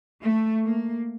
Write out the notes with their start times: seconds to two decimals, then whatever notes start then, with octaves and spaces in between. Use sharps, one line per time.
0.22 A3
0.64 A#3